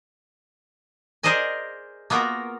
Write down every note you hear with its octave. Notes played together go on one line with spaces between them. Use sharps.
G#4 A#4 C5 D5 D#5 G#5
A#3 B3 F4 F#4 A#4